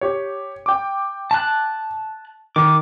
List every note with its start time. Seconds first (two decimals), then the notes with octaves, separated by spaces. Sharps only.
0.01 G4 C#5
0.66 G5 D6
1.31 A5 F#6
2.56 D#3 D6